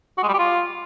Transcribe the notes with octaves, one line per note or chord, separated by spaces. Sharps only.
F#4
G#3
G3
G4
F4